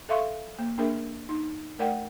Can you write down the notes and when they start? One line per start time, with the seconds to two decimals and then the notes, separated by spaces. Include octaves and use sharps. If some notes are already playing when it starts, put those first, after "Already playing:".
0.09 A4 E5 F5 C6 C#6
0.59 A#3
0.78 A#3 D4 G#4 A#4 E5
1.29 D#4
1.79 A3 A#4 D5 F#5 G5